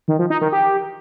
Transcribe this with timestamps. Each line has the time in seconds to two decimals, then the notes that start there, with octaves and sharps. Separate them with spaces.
0.08 D#3
0.19 F3
0.30 D#4
0.41 D#3
0.52 G4